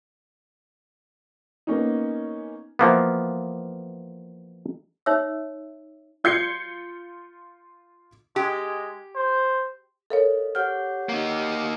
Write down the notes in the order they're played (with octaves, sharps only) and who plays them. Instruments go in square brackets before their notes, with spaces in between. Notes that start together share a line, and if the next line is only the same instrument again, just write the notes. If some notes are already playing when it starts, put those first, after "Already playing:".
[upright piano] A#3 B3 C#4 D#4
[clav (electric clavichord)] E3 F3 A#3 B3
[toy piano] D#4 C#5 E5 E6
[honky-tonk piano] F4 G6 G#6 C7 C#7
[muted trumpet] G#3 [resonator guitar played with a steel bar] G4
[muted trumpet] C5
[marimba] A4 A#4 C#5 [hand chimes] D#5 F5
[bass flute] G4 [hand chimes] C#5 F#5 G6 [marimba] F6
[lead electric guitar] A#3 D#4